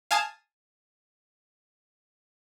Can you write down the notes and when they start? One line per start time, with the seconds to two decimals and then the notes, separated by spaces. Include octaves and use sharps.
0.11 F5 G#5 A5 D#6 G#6